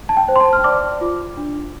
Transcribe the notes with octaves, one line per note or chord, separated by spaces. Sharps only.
A5
G5
C5
C6
A5
F6
D5 D6
F4
D4